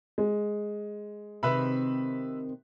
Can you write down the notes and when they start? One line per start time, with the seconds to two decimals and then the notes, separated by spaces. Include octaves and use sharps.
0.18 G#3
1.43 C3 D#3 B4 E5 B5